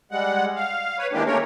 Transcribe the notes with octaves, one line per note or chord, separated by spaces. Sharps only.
G3 G#3 F#5
F5
B4 C#5
D#3 E3 G#3 A#3 D4 G4
A3 A#3 C#4 A#4 C#5